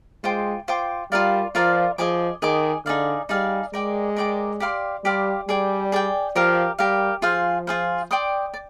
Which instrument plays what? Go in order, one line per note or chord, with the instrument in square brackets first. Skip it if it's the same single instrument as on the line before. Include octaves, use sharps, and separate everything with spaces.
[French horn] G#3 [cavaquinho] F4 C5 G5 D6
[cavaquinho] F4 C5 G5 D6
[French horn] G3 [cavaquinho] F4 A#4 D5 F5
[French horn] F3 [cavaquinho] F4 A#4 D5 F5
[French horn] F3 [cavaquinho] G#4 D#5 G#5 D6
[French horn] D#3 [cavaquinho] G#4 D#5 G#5 D6
[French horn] D3 [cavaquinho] D#4 G#4 D5 F5
[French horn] G3 [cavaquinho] D#4 G#4 D5 F5
[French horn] G#3 [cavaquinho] A#4 D5 G5 D6
[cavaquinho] A#4 D5 G5 D6
G4 D5 F5 C6
[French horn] G3 [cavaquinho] G4 D5 F5 C6
[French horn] G3 [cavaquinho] G#4 D5 G5
[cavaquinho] G#4 D5 G5
[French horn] F3 [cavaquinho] G4 A#4 F5
[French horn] G3 [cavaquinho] G4 A#4 F5
[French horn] F3 [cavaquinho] F4 G#4 C5 F5
[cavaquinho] F4 G#4 C5 F5
D5 G5 C6 D#6
D5